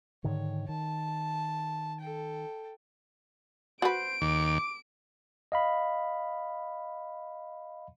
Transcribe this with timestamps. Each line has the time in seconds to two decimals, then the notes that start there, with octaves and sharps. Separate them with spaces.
0.24 G#2 D3 D#3 C#5
0.69 D#3 A5
2.00 A4 G5
3.82 F#4 B4 C5 D7
4.22 D#2 D6
5.52 D#5 F5 B5